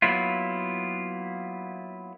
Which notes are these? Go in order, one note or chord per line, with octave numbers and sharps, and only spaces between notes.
F#3 A#3 B3 E4 F4